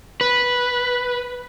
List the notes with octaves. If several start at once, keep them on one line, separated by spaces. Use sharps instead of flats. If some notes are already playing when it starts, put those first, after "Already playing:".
B4